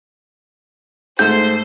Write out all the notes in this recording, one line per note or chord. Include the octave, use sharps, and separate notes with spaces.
G#2 A3 C5 G6